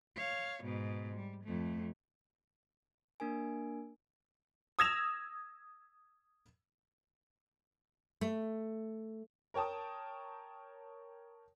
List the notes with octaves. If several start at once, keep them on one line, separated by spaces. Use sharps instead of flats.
C#5 F5
G#2 B2
G3
F2 A3
A#3 D4 A#4 G#5
D#6 E6 G#6 A#6 E7 F7
A3
A#4 C#5 G5 A5 D#6